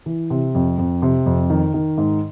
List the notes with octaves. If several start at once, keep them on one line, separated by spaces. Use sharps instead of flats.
E3
C3
F2
F2
C3
F2
D#3
D#3
G#2